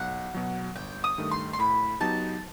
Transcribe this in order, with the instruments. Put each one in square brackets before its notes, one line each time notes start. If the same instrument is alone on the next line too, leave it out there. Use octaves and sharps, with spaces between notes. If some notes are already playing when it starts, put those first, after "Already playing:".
Already playing: [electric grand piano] B1 [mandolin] F#5
[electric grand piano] B2 F#3
[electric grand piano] G1 [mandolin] G5
[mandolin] D#6
[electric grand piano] G2 D#3 A3
[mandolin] C6
C6
[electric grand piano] A2 [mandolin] B5
[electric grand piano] F#3 B3 D#4 G4 [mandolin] A5